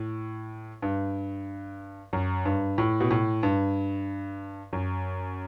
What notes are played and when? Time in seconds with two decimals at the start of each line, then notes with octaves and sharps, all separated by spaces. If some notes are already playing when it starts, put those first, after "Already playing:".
Already playing: A2
0.82 G2
2.13 F#2
2.45 G2
2.78 A2
3.00 B2
3.11 A2
3.43 G2
4.73 F#2